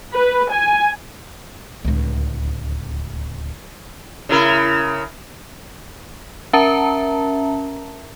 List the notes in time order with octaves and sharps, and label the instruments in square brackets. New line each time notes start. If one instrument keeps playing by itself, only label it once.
[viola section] B4
G#5
[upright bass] D1 C#2
[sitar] C#3 E4 A#4
[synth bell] C#4 A#4 E5 A5 A#5